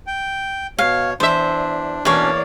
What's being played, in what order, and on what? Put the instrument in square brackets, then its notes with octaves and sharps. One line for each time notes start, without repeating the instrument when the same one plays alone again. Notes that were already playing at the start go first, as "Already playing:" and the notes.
[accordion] G5
[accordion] B2 C#5 [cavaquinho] F5
[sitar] E2 E5 [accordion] D4 [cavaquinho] C5
[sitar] E2 A#3 [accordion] B2 C#4 D4 [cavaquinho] C#5 D5